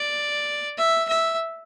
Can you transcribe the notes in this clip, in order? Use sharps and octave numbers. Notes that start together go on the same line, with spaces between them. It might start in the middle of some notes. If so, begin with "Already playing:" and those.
Already playing: D5
E5
E5